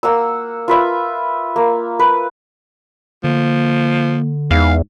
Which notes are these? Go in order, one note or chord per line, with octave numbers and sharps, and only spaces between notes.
A#3 F#5 E6
F4 B4 E5
A#3
B4
D3 F3 A#3
E2 G#2 F5